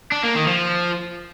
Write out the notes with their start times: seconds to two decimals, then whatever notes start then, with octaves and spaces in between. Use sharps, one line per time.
0.12 D4
0.24 A#3
0.36 D#3
0.48 F3